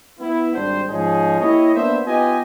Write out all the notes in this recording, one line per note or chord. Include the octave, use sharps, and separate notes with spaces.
B3 E4
G#1 G3 D4 C5
G#2 F3 C#4 D#4 G#4
A#3 E4 G4 C#5 D#5
A#3 B3 D4 C5 E5
B3 D#4 F4 G4 D#5 G#5